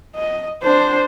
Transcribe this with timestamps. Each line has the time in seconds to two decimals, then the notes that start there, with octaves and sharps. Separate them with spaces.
0.15 D#5
0.63 D4 C5